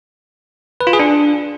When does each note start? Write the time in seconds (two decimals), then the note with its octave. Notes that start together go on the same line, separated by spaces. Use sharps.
0.81 B4
0.87 F4
0.93 G#4
1.00 D4